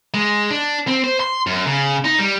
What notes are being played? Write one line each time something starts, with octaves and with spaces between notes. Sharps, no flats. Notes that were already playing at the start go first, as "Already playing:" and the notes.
G#3
D4
C4
C5
C6
F#2
C#3
D#4
G3